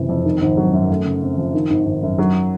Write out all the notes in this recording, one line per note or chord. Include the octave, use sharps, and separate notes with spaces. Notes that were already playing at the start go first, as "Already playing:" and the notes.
Already playing: F#1 C3 E3
F2
D#3
G#1
F#3
F#2
A3
C#3
C4
F3
D#3
G#1
G#1
F#2
F#3